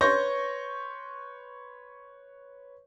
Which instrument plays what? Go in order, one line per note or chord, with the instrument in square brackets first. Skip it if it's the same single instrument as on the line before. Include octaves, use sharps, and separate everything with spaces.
[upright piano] B4 C#5 C6 C#6 G6 A#6